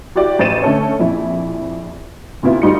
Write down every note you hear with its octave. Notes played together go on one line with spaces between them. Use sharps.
E4 F#4 G4 D5
A1 C5 A6 D#7 E7
D3 A3 C#4 A4 C#5
A#1 F2 E4
D2 C3 B3 E4 F4
D2 G3 D#4 F4 C#7